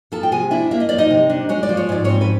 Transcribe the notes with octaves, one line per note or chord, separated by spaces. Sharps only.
F3 A4 A5
G5
C3 G#4 G#5
D4 E4 E5
A#3 E5
D#5
F3 D5
D#4 D#5
C3
D4
G#3 C#5
D5
F3
C#5
G#2 D5
C4 C#4 C#5
B4